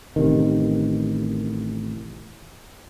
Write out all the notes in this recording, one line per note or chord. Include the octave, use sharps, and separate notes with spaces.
A1 C3 D#3